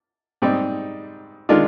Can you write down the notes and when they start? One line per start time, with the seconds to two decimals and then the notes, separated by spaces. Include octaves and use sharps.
0.42 G#2 G3 C4 D#4
1.49 D#3 G#3 D4 F4